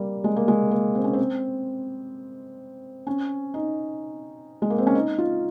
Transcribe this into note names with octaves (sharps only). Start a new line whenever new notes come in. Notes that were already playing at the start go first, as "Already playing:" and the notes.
Already playing: G3 A#3
G#3
A#3
G#3
A#3
C4
C#4
C4
C#4
D#4
G#3
A#3
C4
C#4
D#4
F4